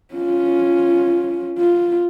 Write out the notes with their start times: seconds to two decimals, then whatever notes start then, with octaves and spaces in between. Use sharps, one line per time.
0.14 C#4 F4
1.59 F4